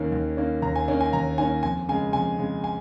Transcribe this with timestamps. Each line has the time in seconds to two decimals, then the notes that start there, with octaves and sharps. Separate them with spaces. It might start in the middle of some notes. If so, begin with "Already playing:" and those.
Already playing: D#2 D#3 A#3 C#4
0.12 D#2
0.37 D#3 A#3 C#4
0.62 D#2 A#5
0.76 G#5
0.88 D#3 A#3 C#4
1.01 G#5
1.13 D#2 A#5
1.38 D#3 A#3 C#4 G#5
1.63 F2 G#5
1.89 C#3 G#3 G#5
2.13 F2 G#5
2.39 C#3 G#3
2.64 G#5